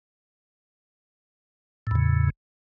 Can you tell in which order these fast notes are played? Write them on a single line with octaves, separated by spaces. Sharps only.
A2 E2 C#3